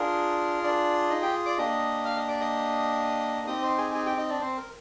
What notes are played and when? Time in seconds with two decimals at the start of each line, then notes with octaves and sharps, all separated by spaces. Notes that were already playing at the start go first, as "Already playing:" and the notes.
Already playing: D4 F4 G#4 A#4
0.63 D4 D5
1.10 D#4 D#5
1.22 G4 G5
1.45 D5 D6
1.57 A#3 D4 G4 D#5 D#6
2.05 F5 F6
2.16 D#5 D#6
2.28 D5 D6
2.40 D#5 D#6
3.47 C4 D#4 G4 D#5 D#6
3.62 C5 C6
3.78 G#4 G#5
3.94 G#4 G#5
4.06 G4 G5
4.17 D#4 D#5
4.29 D4 D5
4.41 C4 C5
4.57 A#4